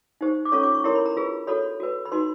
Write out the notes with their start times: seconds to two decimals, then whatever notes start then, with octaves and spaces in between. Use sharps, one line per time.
0.21 D#4 G4 C5
0.45 D6
0.52 C#4 F4 A4 C#5 C#6
0.63 D6
0.74 C#6
0.84 E4 G4 A#4 C#5 C6
0.95 B5
1.06 A#5
1.17 F4 G#4 B4
1.47 F#4 A4 C#5 B5
1.80 F#4 B4
2.05 B5
2.12 D#4 F#4 B4 C6